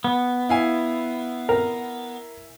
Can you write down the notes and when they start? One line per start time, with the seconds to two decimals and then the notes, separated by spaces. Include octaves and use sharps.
0.04 B3
0.49 E4 F5 G#5
1.49 A#4